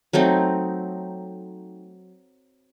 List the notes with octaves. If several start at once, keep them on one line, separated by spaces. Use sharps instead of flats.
F#3 A3 C4 D#4